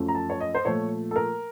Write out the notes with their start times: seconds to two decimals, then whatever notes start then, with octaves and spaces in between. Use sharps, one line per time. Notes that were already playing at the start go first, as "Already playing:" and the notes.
Already playing: F#2 F3 A3
0.08 A#5
0.15 A5
0.30 C#5
0.40 D#5
0.55 C5
0.65 A#2 F3 A3 C#5
1.11 A4
1.16 A#4